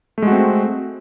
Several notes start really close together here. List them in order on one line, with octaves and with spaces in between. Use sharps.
A3 G#3 F#4 C4